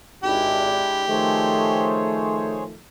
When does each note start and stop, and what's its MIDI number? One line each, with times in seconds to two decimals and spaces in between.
0.24 0.81 32
0.24 1.05 56
0.24 1.05 62
0.24 1.05 64
0.24 1.95 67
1.09 2.78 51
1.09 2.78 53
1.09 2.78 57
1.09 2.63 68
1.09 2.63 72
1.09 2.63 73